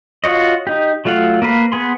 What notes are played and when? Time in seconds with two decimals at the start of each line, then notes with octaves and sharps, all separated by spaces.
0.24 F4 F#4 C#5 D#5
0.67 D#4 G4
1.05 F#3 A3 F4 F5 F#5
1.42 A#3 A#4 B4 F5
1.72 B3 G#4 C6